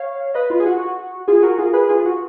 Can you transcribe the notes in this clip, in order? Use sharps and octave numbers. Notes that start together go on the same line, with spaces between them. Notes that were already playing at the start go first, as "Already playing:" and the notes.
Already playing: C#5 F5
B4 D#5
F4
G#4
F#4
F4 G#4
F#4 A#4
F4 G#4
G#4 B4
F4 G#4
F#4